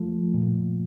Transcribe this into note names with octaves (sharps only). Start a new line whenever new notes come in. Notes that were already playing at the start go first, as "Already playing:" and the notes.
Already playing: F3 A3
A#2